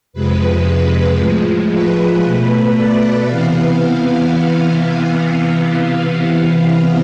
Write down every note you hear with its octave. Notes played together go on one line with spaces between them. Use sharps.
F2 C3 G#3 B4
A2 F3 G#3
B4
B2 A3
D5
C3 E3 B3 F5